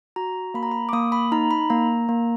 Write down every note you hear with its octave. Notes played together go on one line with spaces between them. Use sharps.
F#4 A#5
A#3 B5
A#5
B5
D6
A#3 D#6
B5
D#4 A#5
B5
A#3 A#5
A#3